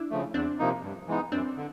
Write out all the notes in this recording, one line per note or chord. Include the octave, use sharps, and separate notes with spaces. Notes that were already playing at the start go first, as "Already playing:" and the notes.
Already playing: D4 E4
C#3 F3 A3
E2 C4 D4
C3 F3 A#3 D#4
G2
E3 G#3 B3 D#4
F#2 C4 D4
D3